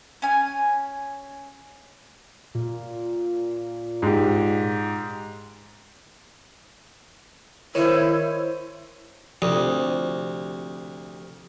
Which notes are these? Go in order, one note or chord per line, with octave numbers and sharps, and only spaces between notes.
C#4 G#5
A#2
G#2 G4
D#3 E4 C5 C#5
D2 C3 F3 G4 D#6